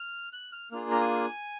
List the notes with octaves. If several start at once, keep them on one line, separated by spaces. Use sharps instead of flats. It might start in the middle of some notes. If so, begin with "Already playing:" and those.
Already playing: F6
F#6
F6
A#3 D4 F4 G#4 F6
A#5
G#5